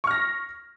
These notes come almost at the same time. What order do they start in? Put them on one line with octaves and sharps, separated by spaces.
C#6 F6 A#6